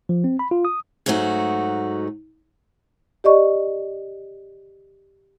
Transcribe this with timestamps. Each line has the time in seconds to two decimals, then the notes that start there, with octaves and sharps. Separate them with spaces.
0.09 F3
0.24 C4
0.39 B5
0.51 F4
0.65 D#6
1.06 G#2 F#3 A3 D#4 F#4
3.24 G4 D5 D#5 C#6